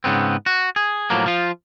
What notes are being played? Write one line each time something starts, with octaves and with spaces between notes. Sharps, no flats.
G#2 C#3 B3 C4
F#4
G#4
A2 F3 F#3 A#3
F3 F4